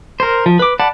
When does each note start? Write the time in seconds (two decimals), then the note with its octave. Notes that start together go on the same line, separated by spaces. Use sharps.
0.20 A#4 C5
0.46 F3
0.59 B4 D6
0.80 D5 F#5 A5 B5